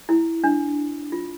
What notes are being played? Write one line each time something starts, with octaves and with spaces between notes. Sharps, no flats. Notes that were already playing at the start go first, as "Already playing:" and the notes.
E4
D4
F4